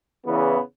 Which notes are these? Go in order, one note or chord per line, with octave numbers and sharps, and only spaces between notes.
E2 C#3 E3 B3